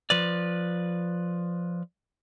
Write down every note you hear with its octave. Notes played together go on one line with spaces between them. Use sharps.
F3 B4 D5